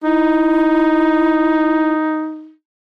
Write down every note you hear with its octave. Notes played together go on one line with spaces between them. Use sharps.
D#4 E4